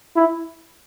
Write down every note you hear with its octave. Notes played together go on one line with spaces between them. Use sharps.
E4